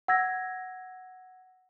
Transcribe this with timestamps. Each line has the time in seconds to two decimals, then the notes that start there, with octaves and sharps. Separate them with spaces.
0.08 F#5 E6 G#6 A#6